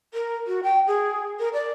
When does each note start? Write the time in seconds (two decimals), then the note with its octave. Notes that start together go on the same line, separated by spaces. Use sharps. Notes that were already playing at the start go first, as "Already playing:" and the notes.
0.14 A#4
0.47 F#4
0.63 G5
0.87 G#4
1.39 A#4
1.53 D5